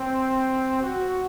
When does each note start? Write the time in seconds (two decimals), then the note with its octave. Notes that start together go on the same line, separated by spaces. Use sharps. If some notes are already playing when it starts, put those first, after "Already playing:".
Already playing: C4
0.82 F#4